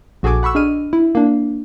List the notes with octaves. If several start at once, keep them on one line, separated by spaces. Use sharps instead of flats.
A#1 F#4 G#4 A4 G#5 D6
F#5 B5 C#6 E6
D4 G#4 D#5 F6 D#7
E4
A#3 D4